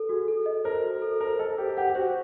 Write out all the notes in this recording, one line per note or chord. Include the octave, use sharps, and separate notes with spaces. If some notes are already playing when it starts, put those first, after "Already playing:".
Already playing: A4
F#4 G#4
A4
D#5
A#4 C5
F#4
A4
A#4 C5
A4 D#5
G4 C5
G4 F#5
G4
F#4 C5